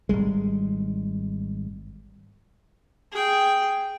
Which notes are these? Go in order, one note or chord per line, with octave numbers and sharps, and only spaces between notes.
G#1 G#2 G3 G#3
G#4 G5